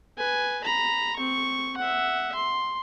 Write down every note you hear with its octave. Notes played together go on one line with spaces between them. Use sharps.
B4 G#5
A#5 B5
C4 C#6
E5 F#5
C6